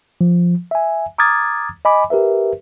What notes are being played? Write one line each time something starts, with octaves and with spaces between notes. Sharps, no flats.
F3
E5 G#5
A#5 D6 D#6 F6 G#6 A6
D#5 G#5 B5 D6
G4 A#4 B4 E5